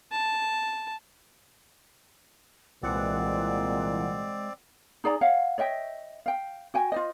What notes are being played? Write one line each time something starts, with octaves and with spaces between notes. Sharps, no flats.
A5
C2 A#2 E3 G#3 C4 D5 F#5
D#4 G#4 D5 A#5
C#5 F5 F#5
C#5 D#5 E5 G5
F5 G5
F#4 G5 G#5
F4 C5 D#5